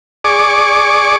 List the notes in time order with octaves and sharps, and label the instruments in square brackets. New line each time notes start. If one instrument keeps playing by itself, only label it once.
[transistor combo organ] G#4 D5 C#6 D6